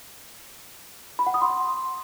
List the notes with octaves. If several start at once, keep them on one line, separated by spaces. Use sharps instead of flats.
B5
F#5
D#6
C6